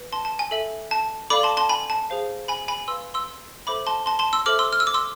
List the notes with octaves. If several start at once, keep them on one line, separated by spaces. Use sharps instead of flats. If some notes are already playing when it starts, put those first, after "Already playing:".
Already playing: B4
A5 C6
A5
G#5
A4 E5
A5
A4 D5 F5 B5 D6
A5 C6
A5 C6
G#5 B5
A5
G#4 C5 F5
G#5 B5
G#5 B5
B4 F5 C6 E6
C6 E6
A4 C5 E5 B5 D6
A5 C6
A5 C6
A5 C6
C6 E6
A4 C5 E5 D6 F6
C6 E6
F6
E6
D6
C6 E6